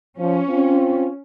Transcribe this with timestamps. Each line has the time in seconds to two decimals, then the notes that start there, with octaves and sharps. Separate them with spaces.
0.18 F3 C#4
0.49 C4 F4